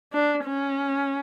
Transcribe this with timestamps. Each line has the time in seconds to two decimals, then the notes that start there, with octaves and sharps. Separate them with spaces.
0.12 D4
0.44 C#4